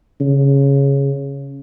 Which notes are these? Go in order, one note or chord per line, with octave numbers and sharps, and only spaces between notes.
C#3